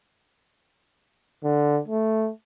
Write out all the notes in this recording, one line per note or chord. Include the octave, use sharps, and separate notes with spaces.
D3
A3